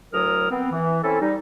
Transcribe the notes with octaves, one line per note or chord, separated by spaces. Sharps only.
D2 A2 F#3 A#4 D#6 F6
B3 C4
E3
C4 C#4 E4 A4
G3 D#4